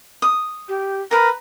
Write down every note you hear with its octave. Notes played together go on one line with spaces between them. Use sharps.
D#6
G4
A#4 B4 A#5